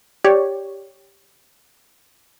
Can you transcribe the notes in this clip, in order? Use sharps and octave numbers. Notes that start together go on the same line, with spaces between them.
G4 C#5 D5